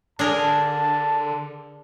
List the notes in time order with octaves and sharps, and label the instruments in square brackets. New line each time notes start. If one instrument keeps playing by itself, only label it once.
[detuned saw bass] D3 [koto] D4 G#4 A#4 [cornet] A5